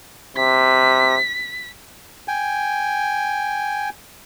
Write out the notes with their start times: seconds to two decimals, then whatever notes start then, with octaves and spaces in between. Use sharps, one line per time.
0.37 C3 B6
2.28 G5 G#5